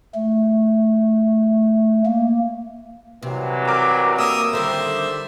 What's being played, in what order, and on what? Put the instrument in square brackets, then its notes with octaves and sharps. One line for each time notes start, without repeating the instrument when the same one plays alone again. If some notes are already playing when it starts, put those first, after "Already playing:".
[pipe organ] A3
A#3
[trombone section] C2 E3 F#3 [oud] C3
[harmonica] A#4 [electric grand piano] A#5 D6 F6
[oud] A#3 [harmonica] A#4 D#6 E6
[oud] D3 D#3 G3 [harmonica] C5 E5